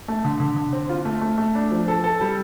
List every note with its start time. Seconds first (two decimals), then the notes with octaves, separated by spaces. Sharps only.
0.08 A3
0.25 D3
0.40 D3
0.56 D3
0.73 C4
0.89 F4
1.05 A3
1.21 A3
1.38 A3
1.55 D4
1.71 F3
1.88 A4
2.04 A4
2.21 G3